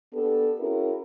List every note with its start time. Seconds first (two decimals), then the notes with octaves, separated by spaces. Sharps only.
0.13 B3 D4 G4 A4
0.58 C#4 E4 F#4 G#4 A#4